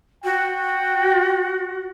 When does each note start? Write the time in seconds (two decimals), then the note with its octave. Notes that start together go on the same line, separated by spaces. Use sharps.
0.24 F#4 G5